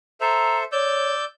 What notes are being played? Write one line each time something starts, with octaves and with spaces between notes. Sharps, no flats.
A4 C5 E5 A#5
C#5 D5 E6 G6